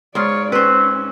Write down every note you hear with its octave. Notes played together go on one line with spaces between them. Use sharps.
G#2 F4 C#5 D5
C4 C#4 B4 C5